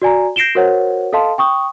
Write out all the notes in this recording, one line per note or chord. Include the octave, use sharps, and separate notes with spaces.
F#4 D5 G#5 A#5
G6 A#6 C7 D7 E7 G7
F#4 A#4 C5 C#5 F#5
A4 D#5 F5 A5 C6
G5 C#6 D#6